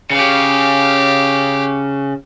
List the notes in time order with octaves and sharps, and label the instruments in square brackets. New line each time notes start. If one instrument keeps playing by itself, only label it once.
[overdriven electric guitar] C#3 [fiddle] G4 F5